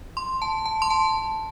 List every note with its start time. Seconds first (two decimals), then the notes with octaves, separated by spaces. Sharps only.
0.17 C6
0.42 A5
0.66 A5
0.82 C6
0.90 A5